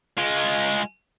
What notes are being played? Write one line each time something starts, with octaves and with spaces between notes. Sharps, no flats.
G#3 F4